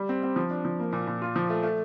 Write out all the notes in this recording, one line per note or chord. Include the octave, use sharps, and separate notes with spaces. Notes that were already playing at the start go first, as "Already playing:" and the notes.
Already playing: G3
C4
C4
F3
D4
F3
A#3
A#2
A#2
F4
F3
A3
A3